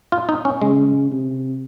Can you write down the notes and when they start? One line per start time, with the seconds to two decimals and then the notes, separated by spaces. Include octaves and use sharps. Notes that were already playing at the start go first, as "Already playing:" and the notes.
0.12 F4
0.29 D#4
0.45 C#4
0.62 C#3 G#3
1.11 C3